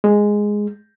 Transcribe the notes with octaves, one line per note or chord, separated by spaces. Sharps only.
G#3